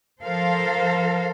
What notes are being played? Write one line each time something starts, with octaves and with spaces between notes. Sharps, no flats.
F3 A4 A#4 C5 F5